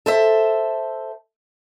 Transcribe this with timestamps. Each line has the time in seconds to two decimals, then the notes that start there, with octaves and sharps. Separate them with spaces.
0.06 A4 C5 E5